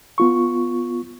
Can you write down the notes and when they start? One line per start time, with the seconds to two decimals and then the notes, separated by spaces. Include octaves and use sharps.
0.18 B3 F4 C#6